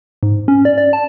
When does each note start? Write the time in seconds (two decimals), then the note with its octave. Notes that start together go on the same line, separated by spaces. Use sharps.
0.23 G#2
0.48 C#4
0.65 D5
0.78 D5
0.93 A5